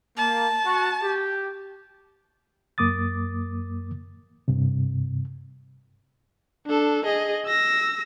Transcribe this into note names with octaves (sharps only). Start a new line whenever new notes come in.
A#3 A5
F#4
G4
F#2 A#3 D6 D#6 A6
G2 C3
D4 A4
G#4 D#5
E6 A#6